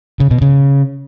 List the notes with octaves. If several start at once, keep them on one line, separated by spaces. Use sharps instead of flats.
C#3
B2
C#3